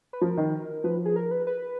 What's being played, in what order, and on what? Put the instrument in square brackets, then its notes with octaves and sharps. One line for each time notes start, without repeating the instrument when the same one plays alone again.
[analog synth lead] B4
[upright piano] F3 [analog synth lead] A#4
[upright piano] D#3
[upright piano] F3 [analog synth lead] B4
[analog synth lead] G#4
A#4
B4
B4